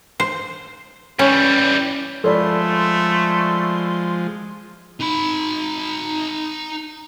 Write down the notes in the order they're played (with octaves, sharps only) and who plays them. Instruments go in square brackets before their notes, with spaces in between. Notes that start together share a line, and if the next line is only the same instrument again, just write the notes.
[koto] C5
[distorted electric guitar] E3 G3 [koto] C#4
[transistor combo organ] F3 G#3 [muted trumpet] A3 [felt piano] A4 D5 B5 [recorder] C6
[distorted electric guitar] D#4 B5